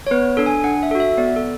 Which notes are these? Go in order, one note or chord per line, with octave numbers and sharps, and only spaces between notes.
C#5
B3 B4
D4 A4
G#5
D4 F#5
E5
F#4 A4
E5
B3 D5
A4